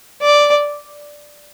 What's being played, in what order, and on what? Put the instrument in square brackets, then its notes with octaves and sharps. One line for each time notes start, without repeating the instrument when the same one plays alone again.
[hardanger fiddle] D5